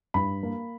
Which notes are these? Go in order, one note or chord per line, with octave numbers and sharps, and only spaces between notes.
G2 B5
A#3